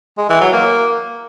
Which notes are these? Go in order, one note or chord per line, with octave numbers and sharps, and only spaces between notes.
G#3
E3
F#3
A#3